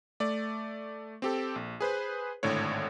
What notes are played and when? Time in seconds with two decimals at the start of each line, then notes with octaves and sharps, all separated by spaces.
0.20 A3 D5
1.22 C4 G4 A4
1.56 A#1
1.81 G#4 B4 C5
2.43 G#1 A2 D3 D4 C#5